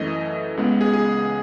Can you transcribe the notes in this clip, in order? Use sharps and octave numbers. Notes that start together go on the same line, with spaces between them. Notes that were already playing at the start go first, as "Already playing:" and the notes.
Already playing: F#2 E3 A3 D#5
C#2 C#3 G#3 B3
G#4
G#4